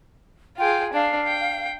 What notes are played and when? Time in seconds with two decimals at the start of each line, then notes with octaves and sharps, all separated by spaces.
0.57 F4 G#4 G5
0.93 D4 F5
1.27 G5